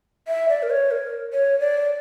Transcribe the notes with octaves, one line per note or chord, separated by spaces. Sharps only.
E5
D5
A#4
C#5
A#4
C#5
D5